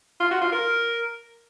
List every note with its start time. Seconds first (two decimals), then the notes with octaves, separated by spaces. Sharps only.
0.20 F4
0.31 F#4
0.41 F4
0.52 A#4